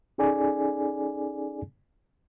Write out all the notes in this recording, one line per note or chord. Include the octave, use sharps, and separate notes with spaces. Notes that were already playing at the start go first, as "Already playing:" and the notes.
C#4 D#4 G#4 A4 D5 G#5